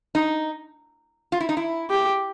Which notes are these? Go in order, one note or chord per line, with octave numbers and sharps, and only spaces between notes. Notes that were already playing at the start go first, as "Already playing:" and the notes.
D#4
F4
E4
D#4
E4
G4